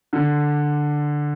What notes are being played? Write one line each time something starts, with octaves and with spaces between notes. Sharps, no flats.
D3